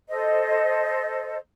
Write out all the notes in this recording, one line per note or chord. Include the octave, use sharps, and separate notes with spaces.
A4 C5 D#5